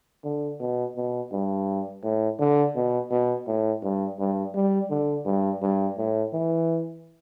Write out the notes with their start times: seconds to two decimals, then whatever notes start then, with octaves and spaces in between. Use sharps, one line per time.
0.24 D3
0.60 B2
0.96 B2
1.32 G2
2.03 A2
2.39 D3
2.75 B2
3.11 B2
3.47 A2
3.83 G2
4.19 G2
4.55 G3
4.90 D3
5.25 G2
5.62 G2
5.98 A2
6.33 E3